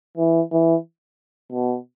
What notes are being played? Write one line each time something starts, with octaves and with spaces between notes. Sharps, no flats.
E3
E3
B2